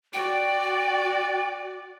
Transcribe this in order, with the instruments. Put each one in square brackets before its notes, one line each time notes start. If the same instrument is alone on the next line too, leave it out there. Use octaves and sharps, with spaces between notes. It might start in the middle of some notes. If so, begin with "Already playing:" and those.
[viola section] F#4 D5 [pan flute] G5